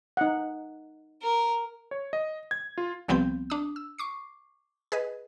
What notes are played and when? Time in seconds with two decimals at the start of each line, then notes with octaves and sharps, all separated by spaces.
0.17 D#4 F#5
1.23 A#4
1.91 C#5
2.13 D#5
2.51 G#6
2.78 F4
3.08 C2 F3 G3 B3 C4 G6
3.50 D4 D#6
3.76 E6
3.98 C#6 D6 C7
4.92 G#4 B4 D#5